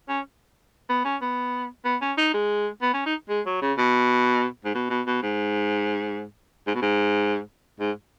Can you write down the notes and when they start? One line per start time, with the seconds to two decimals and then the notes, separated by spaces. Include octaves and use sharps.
0.08 C#4
0.89 B3
1.04 C#4
1.21 B3
1.85 B3
2.01 C#4
2.17 D#4
2.33 G#3
2.81 B3
2.93 C#4
3.06 D#4
3.29 G#3
3.46 F#3
3.61 C#3
3.77 B2
4.64 G#2
4.74 B2
4.90 B2
5.06 B2
5.22 G#2
6.67 G#2
6.74 B2
6.82 G#2
7.79 G#2